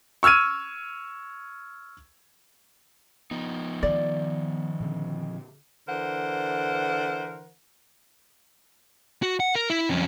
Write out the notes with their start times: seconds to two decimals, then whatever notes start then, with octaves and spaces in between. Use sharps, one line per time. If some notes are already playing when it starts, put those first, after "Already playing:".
0.23 C#6 E6 F6 G#6 D#7
3.31 F3 B3 D#4
3.83 D#3 D5
4.81 A#2 D3 C4
5.88 D3 E3 A#4 C5 F#5
9.23 F#4
9.40 F#5
9.55 A#4
9.70 E4
9.90 F2 C#4